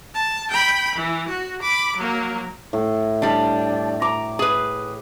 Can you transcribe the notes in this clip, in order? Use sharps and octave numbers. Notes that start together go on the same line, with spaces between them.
A5
G5 B5
E3
F#4
B5 D6
F#3 A#3
A2
G3 D4
A#5 D6
G#4 B4